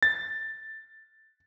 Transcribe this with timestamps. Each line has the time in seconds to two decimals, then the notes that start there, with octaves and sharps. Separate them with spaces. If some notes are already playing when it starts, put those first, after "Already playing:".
0.03 A6